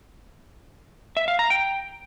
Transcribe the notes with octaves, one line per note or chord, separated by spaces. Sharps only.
E5
F5
A#5
G5